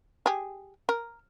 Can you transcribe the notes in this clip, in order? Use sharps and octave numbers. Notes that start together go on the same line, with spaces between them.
G4 G#4
A#4